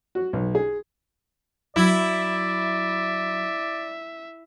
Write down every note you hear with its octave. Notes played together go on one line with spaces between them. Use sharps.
F#4
B1
G#4
F#3 E4 D5 E5